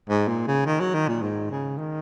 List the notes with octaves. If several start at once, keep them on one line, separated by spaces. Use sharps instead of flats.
G#2
A#2
C#3
D#3
F#3
D#3
A#2
G#2
C#3
D#3